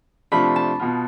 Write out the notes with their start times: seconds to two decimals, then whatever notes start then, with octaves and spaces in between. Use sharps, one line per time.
0.32 C3 F3 A3 D4 F4 B5
0.56 A5
0.80 B2 B3 F4